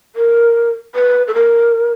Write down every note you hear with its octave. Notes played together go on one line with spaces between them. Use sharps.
A#4
B4
A4
A#4